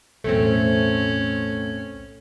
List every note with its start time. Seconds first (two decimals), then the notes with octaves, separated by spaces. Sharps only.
0.24 B1 E2 A2 A3 C4 C#4